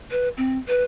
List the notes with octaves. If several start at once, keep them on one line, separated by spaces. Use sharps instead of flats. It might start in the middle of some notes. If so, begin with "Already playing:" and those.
B4
C4
B4